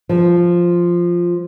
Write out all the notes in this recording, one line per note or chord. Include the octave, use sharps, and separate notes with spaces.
F3